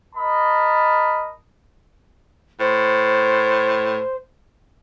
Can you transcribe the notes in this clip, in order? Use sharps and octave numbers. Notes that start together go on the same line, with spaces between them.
A#4 D#5 A5 B5
A2 C5